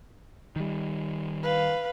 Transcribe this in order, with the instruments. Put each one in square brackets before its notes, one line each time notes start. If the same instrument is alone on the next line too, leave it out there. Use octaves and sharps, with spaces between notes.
[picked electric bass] D#3 G3
[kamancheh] B4 F5